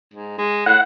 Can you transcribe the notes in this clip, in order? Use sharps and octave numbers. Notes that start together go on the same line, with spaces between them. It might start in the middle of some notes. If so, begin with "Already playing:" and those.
G#2
G#3
A2 F#5